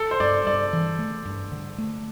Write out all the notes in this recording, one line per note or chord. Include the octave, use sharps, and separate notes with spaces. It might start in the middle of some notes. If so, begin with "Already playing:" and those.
Already playing: A4
C5
G2 D5
G2 D5
E3
A3
G2
D3
A3